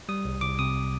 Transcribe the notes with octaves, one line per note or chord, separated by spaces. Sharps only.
G3 D#6
C2
C2 D6
C3 D#6